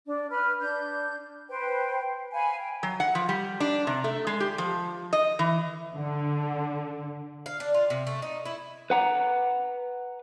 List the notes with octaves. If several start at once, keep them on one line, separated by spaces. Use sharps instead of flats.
D4
B4 B5 F6
D4 G6
B4 C5 G5
F5 F#5 G#5 B5
G5
F#3
F#5
F3
G3
D4
C3
A3
G#3
G4
F3
D#5
E3
D3
F5
D4
F4
C3
A3
D#4
E4
B4 F#5 A#5